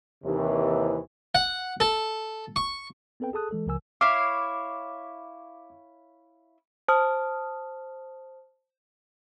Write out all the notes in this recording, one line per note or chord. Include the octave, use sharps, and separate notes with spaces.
D#2 C3 E3
F#5
A4
C#6
B3 C4 A4 B4 G5
G#4 A4 A5 D#6 F#6
E3 G#3 A4
C#2 C#3 F3 A#4 G#5 E6
E4 C#5 F5 D6
C5 A5 D#6 F6